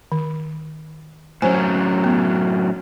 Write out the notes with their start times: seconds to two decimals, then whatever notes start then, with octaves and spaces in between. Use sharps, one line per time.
0.12 D#3
1.42 A2 F#3 C#4 C5 G#5
2.04 B3